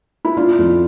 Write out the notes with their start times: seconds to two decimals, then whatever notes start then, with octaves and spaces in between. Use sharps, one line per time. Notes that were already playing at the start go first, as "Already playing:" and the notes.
0.25 E4
0.37 D4 F4
0.59 F2